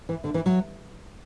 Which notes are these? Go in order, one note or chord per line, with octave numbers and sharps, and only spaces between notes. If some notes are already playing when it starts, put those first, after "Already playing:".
E3
D3
E3
F#3